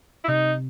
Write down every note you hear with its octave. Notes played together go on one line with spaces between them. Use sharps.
E4
C3 D#4